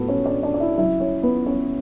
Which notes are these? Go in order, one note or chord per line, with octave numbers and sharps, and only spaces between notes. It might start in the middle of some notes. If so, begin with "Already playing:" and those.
Already playing: A2 A3 B3 F#4 A4 B4
C#4 C#5
D4 D5
D4 D5
D5
E4 E5
C#3 F#3 E4 E5
C#4 C#5
B3 B4
C#4 C#5